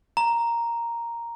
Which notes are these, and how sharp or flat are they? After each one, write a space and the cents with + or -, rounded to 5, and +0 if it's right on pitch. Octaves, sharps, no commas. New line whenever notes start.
A#5 +0